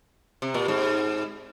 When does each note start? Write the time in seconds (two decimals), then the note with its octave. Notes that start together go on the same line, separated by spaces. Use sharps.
0.42 C3
0.54 A#2
0.68 G#2